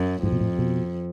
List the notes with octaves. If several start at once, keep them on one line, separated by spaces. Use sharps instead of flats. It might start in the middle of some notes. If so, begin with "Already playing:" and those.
Already playing: F#2
F2 G#2
B2
A2
B2